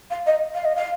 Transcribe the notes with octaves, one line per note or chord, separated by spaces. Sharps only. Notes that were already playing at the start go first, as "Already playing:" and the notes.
F5
D#5
F5
D#5
F5